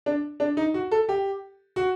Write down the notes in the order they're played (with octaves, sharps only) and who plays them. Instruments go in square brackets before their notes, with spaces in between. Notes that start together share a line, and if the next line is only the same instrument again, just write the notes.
[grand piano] D4
D4
D#4
F#4
A4
G4
F#4